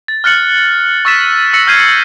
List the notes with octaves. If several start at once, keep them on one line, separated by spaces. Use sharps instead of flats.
A6
F6 F#6 A6 C#7 F#7
C#6 E6 A6 B6 E7
E6 A#6 C#7 F#7
F6 G6 G#6 C7 D#7